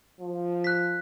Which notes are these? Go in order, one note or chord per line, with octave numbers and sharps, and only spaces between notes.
F3
F#6 B6